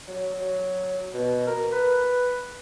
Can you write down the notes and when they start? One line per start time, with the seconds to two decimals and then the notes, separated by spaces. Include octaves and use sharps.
0.08 F#3
0.34 F#3
1.14 B2
1.47 A#4
1.72 B4